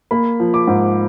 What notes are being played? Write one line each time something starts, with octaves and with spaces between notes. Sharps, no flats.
A#3 B5
F3
D6
G#2